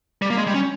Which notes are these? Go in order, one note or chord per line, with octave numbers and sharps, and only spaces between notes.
G3
A#3
G#3
G3
C#4